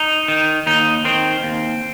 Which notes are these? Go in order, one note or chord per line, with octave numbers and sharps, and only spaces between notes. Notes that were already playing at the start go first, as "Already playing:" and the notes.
Already playing: D#4
D#3
D#2 D#4
D#3 C4
D#2